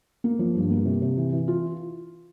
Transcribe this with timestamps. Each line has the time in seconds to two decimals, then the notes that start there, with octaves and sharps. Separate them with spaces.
0.24 A#3
0.39 F3
0.55 G2
0.70 A#3
0.86 C3
1.02 C3
1.17 E3
1.32 E3
1.48 F4